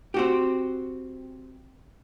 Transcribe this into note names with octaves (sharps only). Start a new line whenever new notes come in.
C4 F#4 G4